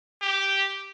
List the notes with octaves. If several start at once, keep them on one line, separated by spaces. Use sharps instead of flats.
G4